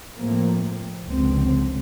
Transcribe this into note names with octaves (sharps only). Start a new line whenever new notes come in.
A2 F3 A3 A#3 C4
F1 C#2 D3 C4